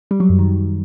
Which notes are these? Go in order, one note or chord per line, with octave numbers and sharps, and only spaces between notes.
G3
F#3
F#2
D#3